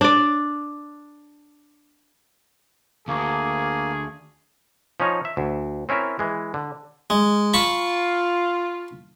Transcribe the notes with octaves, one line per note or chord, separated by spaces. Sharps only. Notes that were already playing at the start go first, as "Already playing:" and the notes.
D4 D5
D2 A#3 G#4
F3 C#4 D#4 C#5 A#5
E5
D2
C4 C#4 E4 A#4 E5
E3 G#3
D3
G#3
F4 A5 B5 C#6